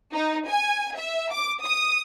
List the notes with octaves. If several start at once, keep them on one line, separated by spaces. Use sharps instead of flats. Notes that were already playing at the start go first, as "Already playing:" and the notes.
D#4
G#5
E5
D6
D#6